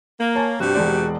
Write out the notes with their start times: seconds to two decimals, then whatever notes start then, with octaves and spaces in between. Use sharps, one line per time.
0.19 A#3
0.35 C#5 G#5 A5
0.60 G2 C3 F#4 G4
0.75 E1 G#3 D5